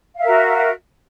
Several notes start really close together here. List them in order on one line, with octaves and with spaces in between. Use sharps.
F5 E5 A#4 F#4